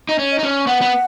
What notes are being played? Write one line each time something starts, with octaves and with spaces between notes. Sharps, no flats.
D#4
C#4
D#5
D#4
C#4
B3 F#5
B3